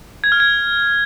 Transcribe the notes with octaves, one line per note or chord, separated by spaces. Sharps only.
G#6
F6
G#6